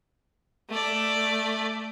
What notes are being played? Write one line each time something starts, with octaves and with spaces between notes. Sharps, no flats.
A3 D5